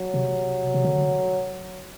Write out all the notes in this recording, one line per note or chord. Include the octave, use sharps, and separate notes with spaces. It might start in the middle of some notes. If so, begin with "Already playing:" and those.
Already playing: F#3
C3
C3
D3